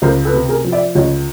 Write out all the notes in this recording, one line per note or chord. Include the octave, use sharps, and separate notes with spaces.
C#2 A#4 C5
A4 B4
C3
G#4 A#4
F3
D5 E5
C#2 C#5 D#5